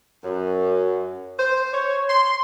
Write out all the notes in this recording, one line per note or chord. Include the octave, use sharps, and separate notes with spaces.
F#2
C5
C#5
C6